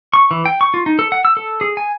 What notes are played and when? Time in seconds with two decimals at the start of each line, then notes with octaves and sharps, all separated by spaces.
0.14 C#6
0.31 E3
0.45 G5
0.61 C#6
0.74 F4
0.86 D#4
0.99 A4
1.12 F#5
1.25 E6
1.37 A4
1.61 G#4
1.77 G#5